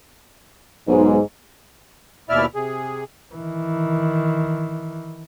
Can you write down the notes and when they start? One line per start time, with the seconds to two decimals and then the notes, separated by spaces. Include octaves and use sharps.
0.88 B1 G#2
2.29 D#2 B2 E4 D5 E5 F6
2.55 C3 G#4
3.35 D#3 E3